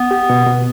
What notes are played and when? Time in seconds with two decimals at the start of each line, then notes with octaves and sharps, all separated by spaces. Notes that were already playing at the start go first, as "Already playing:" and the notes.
Already playing: B3
0.11 G4
0.30 B2
0.47 B2